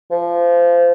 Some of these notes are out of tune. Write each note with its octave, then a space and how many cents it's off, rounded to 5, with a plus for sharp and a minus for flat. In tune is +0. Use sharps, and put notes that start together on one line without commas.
F3 -20